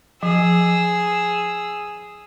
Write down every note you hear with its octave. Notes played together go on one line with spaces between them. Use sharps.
F3 G#4 E6